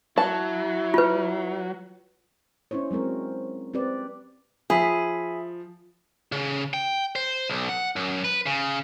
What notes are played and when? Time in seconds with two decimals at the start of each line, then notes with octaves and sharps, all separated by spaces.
0.18 F#3 E4 A5
0.94 F4 B4
2.71 C#4 D4 E4 C5 C#5
2.91 F#3 G#3 C4 A#4
3.74 C4 G4 B4 D5
4.70 F3 G#4 E5 B5 D#6 B6
6.32 C#3
6.74 G5
7.16 C5
7.50 B1
7.69 F#5
7.96 F#2
8.24 B4
8.46 C#3